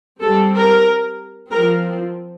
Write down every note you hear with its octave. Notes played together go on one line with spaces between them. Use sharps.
G3 C4 A4
A#4
F3 C4 A#4